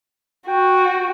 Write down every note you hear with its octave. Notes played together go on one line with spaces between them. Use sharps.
F#4 G5